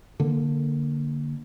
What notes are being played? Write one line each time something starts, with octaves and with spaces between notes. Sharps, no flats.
D3 A#3